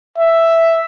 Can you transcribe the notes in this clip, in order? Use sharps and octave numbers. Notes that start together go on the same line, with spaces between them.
E5